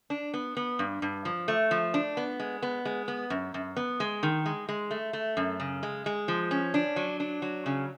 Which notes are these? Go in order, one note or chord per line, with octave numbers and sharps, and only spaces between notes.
D4
B3
B3
G2
G2
F3
A3
F3
D4
B3
G#3
B3
G#3
B3
F#2
F#2
B3
G#3
D#3
G#3
G#3
A3
A3
F#2
C#3
G#3
G#3
F3
C#4
D4
F#3
D4
F#3
C#3